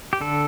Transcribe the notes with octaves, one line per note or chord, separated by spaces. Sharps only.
G4
D3 A4